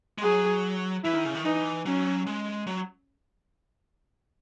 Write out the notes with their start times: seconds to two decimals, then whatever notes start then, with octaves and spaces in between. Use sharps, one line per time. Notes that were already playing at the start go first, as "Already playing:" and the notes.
0.18 G#3
0.23 F#3 G#4
1.04 E3 E4
1.15 D#3
1.25 C#3
1.35 D#3
1.45 E3 D#4
1.86 F#3 C#4
2.26 G#3
2.67 F#3